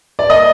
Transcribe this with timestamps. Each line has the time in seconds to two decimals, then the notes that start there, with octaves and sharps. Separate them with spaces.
0.19 D5
0.29 A#3 D#5